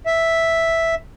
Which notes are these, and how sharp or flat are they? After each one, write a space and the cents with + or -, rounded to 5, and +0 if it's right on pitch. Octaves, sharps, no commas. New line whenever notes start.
E5 +0